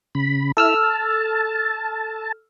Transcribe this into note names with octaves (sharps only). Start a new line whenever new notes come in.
C#3 B5
E4 A4 E5 E6 F6
A5